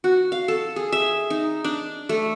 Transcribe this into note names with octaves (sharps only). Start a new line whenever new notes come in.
F#4
F5
A4
G#4
E5
D#4
D4
A3